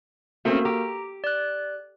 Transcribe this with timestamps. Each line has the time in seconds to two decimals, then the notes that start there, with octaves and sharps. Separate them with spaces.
0.45 A3 A#3 C4 C#4 F#4 A#4
0.65 G4 A#5
1.24 D5 F#6